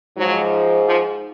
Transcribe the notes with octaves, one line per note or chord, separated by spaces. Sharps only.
G#2 F3 F#3
F3